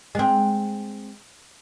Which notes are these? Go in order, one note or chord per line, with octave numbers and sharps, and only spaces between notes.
G#3 C4